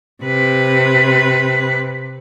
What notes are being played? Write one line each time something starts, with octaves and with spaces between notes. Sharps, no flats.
C3 B4